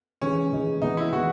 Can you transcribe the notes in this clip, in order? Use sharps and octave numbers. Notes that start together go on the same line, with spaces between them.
E3 G#3 C#4 D#4 G#4
E3 G#3 D#4 G#4
E3 G#3 B3 D#4
E4
E3 G#3 B3 F#4